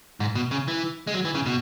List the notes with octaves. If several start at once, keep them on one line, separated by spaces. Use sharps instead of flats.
G#2
B2
C#3
E3
G#3
F#3
E3
C#3
B2